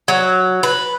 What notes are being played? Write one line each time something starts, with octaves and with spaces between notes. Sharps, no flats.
F#3
B4